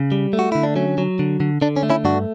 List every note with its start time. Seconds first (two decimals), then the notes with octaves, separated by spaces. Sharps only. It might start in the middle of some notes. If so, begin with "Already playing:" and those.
Already playing: C#3
0.12 G3
0.33 A3
0.39 F#4
0.52 D3 E4
0.63 D4
0.76 F#3 C#4
0.98 F#3
1.19 D3
1.40 D3
1.62 D3 D4
1.76 C#4
1.83 A3
1.90 C#4 E4
2.04 G2 D4 F#4